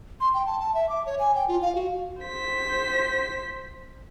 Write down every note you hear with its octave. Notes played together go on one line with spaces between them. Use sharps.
C6
G5
A5
A5
E5
D6
C#5
G#5
G5
F4
F5
F#4
C5 B6